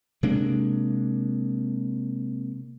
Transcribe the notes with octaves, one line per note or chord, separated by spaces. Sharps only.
C3 G#3 A#3 D4